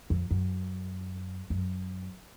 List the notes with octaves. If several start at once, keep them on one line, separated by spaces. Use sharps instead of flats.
F2
F#2
F#2